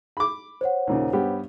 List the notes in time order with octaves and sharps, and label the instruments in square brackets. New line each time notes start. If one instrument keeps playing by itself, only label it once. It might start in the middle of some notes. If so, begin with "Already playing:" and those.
[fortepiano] B5 D6
[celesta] C5 C#5 F#5
[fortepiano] D#2 A#2 C#3
G2 B3 G4